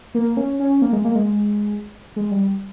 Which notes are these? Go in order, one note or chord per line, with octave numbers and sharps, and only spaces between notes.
A#3
C#4
C#4
A#3
G#3
A#3
G#3
G#3
G3